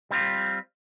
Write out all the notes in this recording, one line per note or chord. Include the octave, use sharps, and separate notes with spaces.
G3 C4 F4